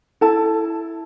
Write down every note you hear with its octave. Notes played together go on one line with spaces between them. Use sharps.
E4 A4 A5